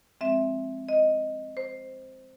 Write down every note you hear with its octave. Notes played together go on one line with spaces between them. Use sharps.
F3 G#3 C4 E5
D#5
C5